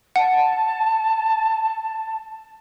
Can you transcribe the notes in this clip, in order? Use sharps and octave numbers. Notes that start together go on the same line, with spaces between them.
F#5 A5